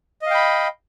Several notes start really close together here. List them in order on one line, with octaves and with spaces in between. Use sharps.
D#5 F5 G5 B5